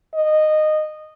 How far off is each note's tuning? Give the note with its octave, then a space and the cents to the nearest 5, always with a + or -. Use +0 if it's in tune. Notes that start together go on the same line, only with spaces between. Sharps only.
D#5 -15